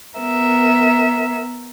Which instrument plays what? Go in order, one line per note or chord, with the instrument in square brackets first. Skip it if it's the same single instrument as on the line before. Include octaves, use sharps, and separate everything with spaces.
[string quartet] B3 A#4 E5